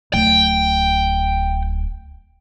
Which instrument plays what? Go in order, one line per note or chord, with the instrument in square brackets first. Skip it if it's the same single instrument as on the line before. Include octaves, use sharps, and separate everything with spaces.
[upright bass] D1 [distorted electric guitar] G5